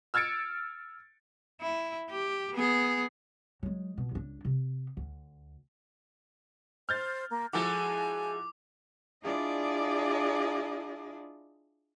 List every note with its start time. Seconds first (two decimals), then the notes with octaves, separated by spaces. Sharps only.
0.14 E6 F6 G#6 A6 C#7 D7
1.61 E4
2.11 G4
2.53 B3 G#4
3.63 F#3 G#3
3.98 B2
4.11 C#2 D4
4.45 C3
4.97 D2
6.89 C5 F6 G6 A6
7.31 A#3
7.53 F3 G#3 E4 F#4 A4 G#5 D6
9.23 D4 E4 F4 G#4 D5 D#5